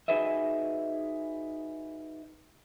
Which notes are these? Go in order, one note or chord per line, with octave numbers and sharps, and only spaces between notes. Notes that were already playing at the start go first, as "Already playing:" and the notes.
D#4 F#4 G#4 B4 D#5 E5